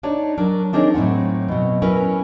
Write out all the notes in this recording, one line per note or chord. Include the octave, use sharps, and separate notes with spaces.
D4 D#4 C#5 D5
F#3 D4 A#4
C4 D4 D#4 G#4 A#4 C#5
A2 F#3 C4 F#5
B2 F#3
F#3 C#4 E4 A#4 B4